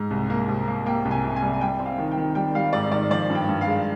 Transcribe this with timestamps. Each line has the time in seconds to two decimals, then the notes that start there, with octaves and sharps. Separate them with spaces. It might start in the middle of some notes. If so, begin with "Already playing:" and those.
Already playing: G#2
0.11 C2
0.30 A#3
0.48 C2
0.68 A#3
0.86 A#3 G5
1.05 C2
1.11 G#5
1.24 C3
1.36 G#5
1.42 G3
1.54 G#5
1.61 G3 G5
1.80 C4
1.86 F5
1.98 D#3
2.11 G5
2.17 D#3
2.35 G3 G5
2.55 G3 F5
2.73 G#2 D5
2.91 D#3 D5
3.10 F3 D5
3.30 G2
3.35 G5
3.49 G2
3.61 F5
3.67 G#3